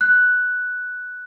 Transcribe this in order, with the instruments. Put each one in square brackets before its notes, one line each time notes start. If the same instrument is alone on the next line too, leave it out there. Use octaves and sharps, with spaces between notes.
[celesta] F#6